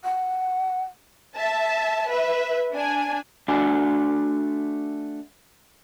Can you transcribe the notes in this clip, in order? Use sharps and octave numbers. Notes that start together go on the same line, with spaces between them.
F#5
E5 A5
B4 E5
D4 G#5
A3 D4 F#4 G#5